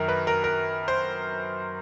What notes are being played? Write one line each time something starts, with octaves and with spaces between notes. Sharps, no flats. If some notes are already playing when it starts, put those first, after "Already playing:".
Already playing: F#2 D#3 A#4
B4
A#4
A#4
C5